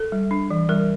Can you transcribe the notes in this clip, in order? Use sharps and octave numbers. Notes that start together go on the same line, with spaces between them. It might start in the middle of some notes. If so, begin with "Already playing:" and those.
Already playing: A4
G3
D4
E3
G3 A#4